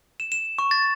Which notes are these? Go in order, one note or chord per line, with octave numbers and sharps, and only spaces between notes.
E7
E7
C#6
A6